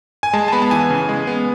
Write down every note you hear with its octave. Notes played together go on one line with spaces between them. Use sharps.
G#5
G#3 A5
A5
B3 B5
A5
E3 G#5
C#3
G#3
B3